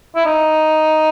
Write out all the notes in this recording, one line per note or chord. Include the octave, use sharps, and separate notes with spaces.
E4
D#4